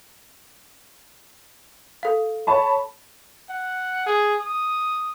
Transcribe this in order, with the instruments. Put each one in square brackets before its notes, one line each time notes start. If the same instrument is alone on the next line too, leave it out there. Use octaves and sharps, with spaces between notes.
[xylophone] A4 F5
[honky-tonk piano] C#5 A5 B5
[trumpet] F#5
G#4
D#6